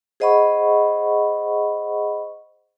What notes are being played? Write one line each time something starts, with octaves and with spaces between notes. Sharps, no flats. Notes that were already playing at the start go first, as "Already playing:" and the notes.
G#4 C5 D#5 F#5 B5 C#6